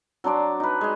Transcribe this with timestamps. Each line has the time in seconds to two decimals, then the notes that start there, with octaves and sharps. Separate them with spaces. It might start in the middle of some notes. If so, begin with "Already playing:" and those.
0.24 F#3 D4 C5 D5
0.60 D#4 B4
0.81 G#3 G#4